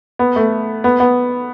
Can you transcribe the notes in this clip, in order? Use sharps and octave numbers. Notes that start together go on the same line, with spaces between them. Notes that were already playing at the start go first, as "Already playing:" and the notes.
B3
A3
B3
B3